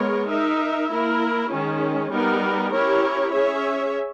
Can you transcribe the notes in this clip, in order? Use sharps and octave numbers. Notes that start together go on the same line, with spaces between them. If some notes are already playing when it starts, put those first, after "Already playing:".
Already playing: G#3 B3 A#4 C#5
D#4 A#4 E5
A#3 E4 A#4
D#3 G#3 C#4
G3 B3 D#4 A#4
C#4 E4 G4 A#4 C#5
C#4 G#4 C#5 E5